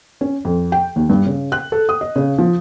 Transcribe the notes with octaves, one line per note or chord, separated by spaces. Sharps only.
C#4
F2
G5
D#2
G2
C#3
F#6
A4
D#6
D#5
C#3
F3